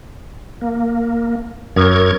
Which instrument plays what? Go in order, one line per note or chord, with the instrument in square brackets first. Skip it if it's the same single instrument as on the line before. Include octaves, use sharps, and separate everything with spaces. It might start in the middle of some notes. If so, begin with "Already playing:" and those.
[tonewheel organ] A#3
[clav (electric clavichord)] F#2 [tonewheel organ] A#4 C#6 G#6